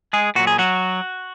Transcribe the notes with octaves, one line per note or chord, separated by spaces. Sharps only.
G#3 G#4
A#2 F#3 F#4
G#4
F#3 F#4